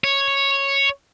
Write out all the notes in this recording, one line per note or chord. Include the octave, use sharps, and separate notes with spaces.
C#5